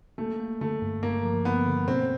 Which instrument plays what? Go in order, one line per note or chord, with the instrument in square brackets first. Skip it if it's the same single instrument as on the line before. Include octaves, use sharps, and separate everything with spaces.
[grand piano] A3 [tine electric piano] A#3
[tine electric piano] A#3
[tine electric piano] D3 [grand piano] A3
[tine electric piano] G2
[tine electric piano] G2 [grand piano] A#3
[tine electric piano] F3
[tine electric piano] A#3 [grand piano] B3
[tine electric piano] D3
[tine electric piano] B2 [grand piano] C4